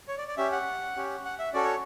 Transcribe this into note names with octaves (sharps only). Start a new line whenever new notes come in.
C#5
D5
D5
C#4 G4 E5
F#5
C#4 G4
F#5
E5
C#4 F#4 A4 D5
C#5